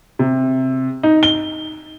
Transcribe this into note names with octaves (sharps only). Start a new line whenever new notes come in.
C3
D#4
G7